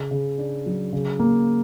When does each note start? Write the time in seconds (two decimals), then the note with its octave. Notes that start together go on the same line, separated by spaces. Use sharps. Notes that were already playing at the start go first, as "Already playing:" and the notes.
Already playing: C#3
0.11 C#3
0.38 D4
0.66 F#3
0.93 C#3
1.19 A#3